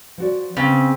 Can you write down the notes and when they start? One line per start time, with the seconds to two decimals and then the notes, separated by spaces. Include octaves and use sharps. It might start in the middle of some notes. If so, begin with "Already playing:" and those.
0.18 F3 F#4 D5
0.57 C#3 B3 C4